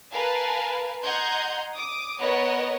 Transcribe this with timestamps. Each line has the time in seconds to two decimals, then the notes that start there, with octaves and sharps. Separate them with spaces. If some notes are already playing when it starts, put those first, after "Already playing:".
0.12 A#4 B4 F5 G#5 A5
1.02 D#5 F#5 A#5 C6 G6 G#6
1.76 D6 D#6
2.20 B3 A#4 B4 C#5 D#5 F#5